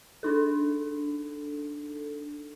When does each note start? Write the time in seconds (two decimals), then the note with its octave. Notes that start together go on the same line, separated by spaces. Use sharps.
0.23 D4 D#4 A4